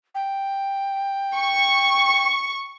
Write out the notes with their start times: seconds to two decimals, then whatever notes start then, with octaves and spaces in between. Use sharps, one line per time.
0.15 G5
1.36 C#6